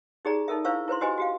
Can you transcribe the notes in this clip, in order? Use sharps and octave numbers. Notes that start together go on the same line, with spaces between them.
D#4 G4 G#4 D5 A#5
D#4 A4 A#4 E5
D4 E4 C5 F5 C#6 E6
E4 B4 C5 C6
F#4 G4 B4 C5 D#5 G#5
F#4 G4 F5